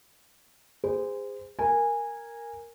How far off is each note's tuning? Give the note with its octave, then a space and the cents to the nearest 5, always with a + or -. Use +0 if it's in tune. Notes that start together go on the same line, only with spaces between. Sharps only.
G#4 -30 C5 -25
A#4 +0 G#5 -15